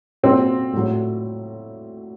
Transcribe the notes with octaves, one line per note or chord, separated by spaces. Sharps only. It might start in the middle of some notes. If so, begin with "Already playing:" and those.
A#2 F#3 C4
A2 F#3